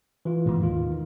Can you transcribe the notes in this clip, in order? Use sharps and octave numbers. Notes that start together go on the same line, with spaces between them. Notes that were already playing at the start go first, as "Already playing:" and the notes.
E3 F4
G#2 B2 D#3
D#2 D#3 F4